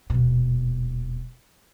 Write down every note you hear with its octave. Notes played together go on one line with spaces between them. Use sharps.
D#1 B2